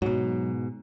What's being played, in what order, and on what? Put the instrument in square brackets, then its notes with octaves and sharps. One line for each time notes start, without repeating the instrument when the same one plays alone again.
[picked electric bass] G#2 B2 [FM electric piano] F#3